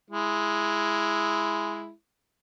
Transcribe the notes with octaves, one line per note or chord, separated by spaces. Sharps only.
G#3 E4